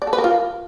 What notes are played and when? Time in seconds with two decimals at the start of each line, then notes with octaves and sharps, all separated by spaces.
0.02 D5
0.07 A4
0.13 B4
0.18 A#4
0.24 F4